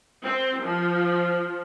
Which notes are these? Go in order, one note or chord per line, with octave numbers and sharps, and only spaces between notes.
C4
F3